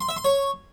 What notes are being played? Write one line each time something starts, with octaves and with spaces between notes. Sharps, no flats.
C6
E5
C6
C#5